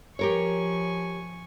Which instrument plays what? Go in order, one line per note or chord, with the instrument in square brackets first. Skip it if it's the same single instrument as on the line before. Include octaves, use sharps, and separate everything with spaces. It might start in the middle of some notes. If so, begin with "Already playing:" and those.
[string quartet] F3 G#5 C#6 [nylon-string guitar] G4 A#4 C#5